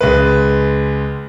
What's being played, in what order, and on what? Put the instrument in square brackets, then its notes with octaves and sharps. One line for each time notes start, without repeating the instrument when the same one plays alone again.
[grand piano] C#2 G#3 B4